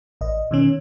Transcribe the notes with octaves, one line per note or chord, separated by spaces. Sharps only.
A1 D#5
B2 D#3 C#4